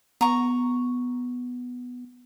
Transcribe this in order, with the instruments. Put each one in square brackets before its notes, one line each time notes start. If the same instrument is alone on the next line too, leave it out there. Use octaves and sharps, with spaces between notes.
[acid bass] B3 [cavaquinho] A#5 C#6